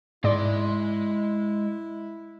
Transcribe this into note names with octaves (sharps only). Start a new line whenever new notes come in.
G#2 G#3 E4 D5 C6